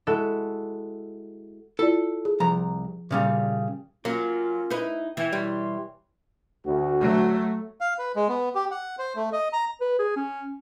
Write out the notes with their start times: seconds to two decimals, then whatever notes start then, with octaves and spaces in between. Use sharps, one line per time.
0.07 G#3 E4 F#4 A4
1.79 E4 F4 A4 D5
2.25 G#4
2.40 C2 F3 A#5
3.11 A#2 C#3 G3
4.05 F#3 A#3 C#4 F4
4.70 D#4 E4 B4
5.17 E3 E4 G5
5.33 B2 G3 C#5 C6
6.66 D2 F#4
7.01 F#3 A3
7.81 F5
7.98 B4
8.16 G#3
8.29 B3
8.55 G4
8.71 F#5
8.99 C5
9.16 A3
9.33 D#5
9.53 A#5
9.81 B4
9.99 G#4
10.16 C#4